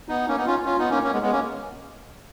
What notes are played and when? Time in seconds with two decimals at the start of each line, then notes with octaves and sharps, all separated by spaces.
0.09 B3 D#4
0.28 A#3 C#4
0.37 B3 D#4
0.46 C#4 F4
0.65 C#4 F4
0.78 B3 D#4
0.90 A#3 C#4
1.03 A#3 C#4
1.12 G#3 B3
1.23 G#3 B3
1.31 A#3 C#4